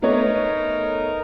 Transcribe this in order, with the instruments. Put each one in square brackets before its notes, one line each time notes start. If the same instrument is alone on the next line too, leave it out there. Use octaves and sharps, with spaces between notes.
[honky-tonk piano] A3 B3 C#5 [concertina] D#4 A#4